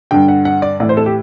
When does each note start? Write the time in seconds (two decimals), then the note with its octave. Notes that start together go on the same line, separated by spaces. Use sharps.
0.11 G2 D3 G5
0.28 F#5
0.45 F#5
0.62 D5
0.80 A2 E3 D5
0.89 C5
0.97 A4
1.06 G4